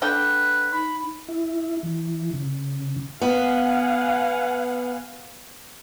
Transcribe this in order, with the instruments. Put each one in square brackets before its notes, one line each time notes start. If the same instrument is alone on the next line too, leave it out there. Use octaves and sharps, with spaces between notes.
[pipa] D3 G5 [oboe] B4
[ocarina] D#4 [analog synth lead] B5
[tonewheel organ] E4
E3
C#3
[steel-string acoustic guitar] B3 [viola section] F5 F#5 G#5